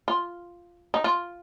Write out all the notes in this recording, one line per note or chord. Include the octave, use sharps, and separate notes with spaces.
F4
D#4
F4